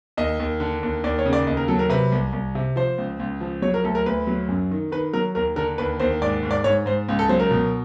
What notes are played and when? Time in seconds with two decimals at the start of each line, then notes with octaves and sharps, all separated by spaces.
0.17 D#2 D#5
0.40 D#2
0.60 D3
0.83 D#2
1.04 D#2 D5
1.19 C#5
1.26 C#3
1.33 D5
1.47 D#2 D#5
1.57 A#4
1.68 F#3 A4
1.79 A#4
1.90 C3 B4
2.12 C2
2.33 C2
2.55 C3
2.76 F3 C5
2.98 C#2
3.19 C#2
3.41 F3
3.62 F#3 C#5
3.74 A#4
3.84 D2 A4
3.95 A#4
4.06 D2 B4
4.27 F#3
4.49 F#2
4.71 D#3
4.92 D#3 B4
5.13 F#3 A#4
5.35 D#2 A#4
5.56 D3 A#4
5.78 D#2 B4
6.00 D#2 C5
6.22 G#2 D5
6.43 G#2
6.51 D5
6.64 G#2 C#5
6.86 G#2 C5
7.08 C#2
7.19 A4
7.29 F#3 C5
7.40 A#4
7.51 B2